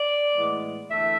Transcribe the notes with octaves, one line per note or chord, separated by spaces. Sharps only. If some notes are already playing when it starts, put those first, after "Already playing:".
Already playing: D5
A2 E3 G#3 B3
E2 D3 A3 E5